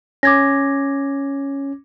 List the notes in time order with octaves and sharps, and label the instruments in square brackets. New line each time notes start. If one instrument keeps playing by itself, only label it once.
[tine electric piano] C#4 [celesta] D6 G#6 A#6